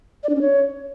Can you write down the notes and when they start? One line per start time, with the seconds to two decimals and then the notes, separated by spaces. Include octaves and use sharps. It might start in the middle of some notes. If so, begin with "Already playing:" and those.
0.23 D5
0.29 D4
0.35 C#4
0.41 C#5